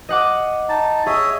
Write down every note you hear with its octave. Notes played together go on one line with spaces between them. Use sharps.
D#5 F#5 D6
D#4 A5
G#4 C#5 D#5 E5